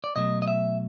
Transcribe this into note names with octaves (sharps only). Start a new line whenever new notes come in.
D5
B2 F#3 A3 D#5
D#5
E5